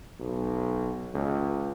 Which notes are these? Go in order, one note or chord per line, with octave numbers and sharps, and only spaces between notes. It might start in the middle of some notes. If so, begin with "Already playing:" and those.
B1
C#2